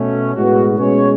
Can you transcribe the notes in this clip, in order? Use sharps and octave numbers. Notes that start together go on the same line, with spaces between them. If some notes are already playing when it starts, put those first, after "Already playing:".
Already playing: B2 A3 C#4
A2 G#3 B3 F#4
B2 G#3 C#4 C#5